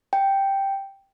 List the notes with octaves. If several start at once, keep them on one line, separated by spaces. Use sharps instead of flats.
G5